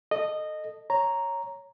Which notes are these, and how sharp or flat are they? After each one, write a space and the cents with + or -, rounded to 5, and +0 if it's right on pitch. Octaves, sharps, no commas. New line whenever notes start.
A4 +0 D#5 -15
C#5 +0 A#5 +0